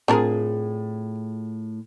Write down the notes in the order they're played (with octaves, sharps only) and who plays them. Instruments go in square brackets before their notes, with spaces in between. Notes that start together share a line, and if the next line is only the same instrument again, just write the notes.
[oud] A2 F4 G#4 [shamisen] C4 D4 A#4